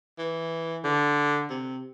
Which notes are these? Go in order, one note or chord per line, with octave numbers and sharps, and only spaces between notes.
E3
D3
C3